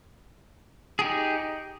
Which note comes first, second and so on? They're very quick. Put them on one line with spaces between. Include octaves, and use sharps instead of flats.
G#4 G4 D#4